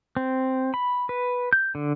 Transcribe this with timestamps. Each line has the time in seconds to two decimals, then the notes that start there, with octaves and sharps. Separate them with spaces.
0.17 C4
0.74 B5
1.09 B4
1.53 G6
1.75 D3